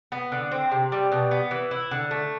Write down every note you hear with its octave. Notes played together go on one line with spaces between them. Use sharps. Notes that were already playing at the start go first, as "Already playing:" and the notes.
B3
D3
C4
C3
G3
B2
B3
E3
E4
D3
A3